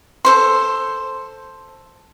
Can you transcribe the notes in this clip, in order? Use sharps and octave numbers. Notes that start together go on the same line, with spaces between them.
A4 C5 C6